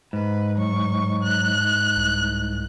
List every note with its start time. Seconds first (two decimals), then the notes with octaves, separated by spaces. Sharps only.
0.13 G#2 B4
0.58 F#3 C#6
1.23 F#6
1.97 C2